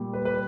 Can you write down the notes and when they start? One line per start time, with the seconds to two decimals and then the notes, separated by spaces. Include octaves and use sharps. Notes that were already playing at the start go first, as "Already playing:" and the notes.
Already playing: A#2 G3
0.14 B4
0.25 B4